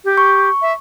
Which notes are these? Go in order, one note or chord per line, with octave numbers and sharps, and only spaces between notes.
G4
C#6
E5